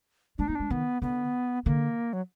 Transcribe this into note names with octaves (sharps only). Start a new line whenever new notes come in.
G#3 D4
A#3 D#4
G#3 D4
D#3 B3
D3 B3
D3 A#3
F#3